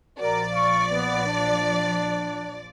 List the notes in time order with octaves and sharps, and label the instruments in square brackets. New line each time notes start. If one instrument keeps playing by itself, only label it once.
[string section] A#1 F3 D5 [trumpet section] F#4 A#4
[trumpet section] F5 C#6
B3
D4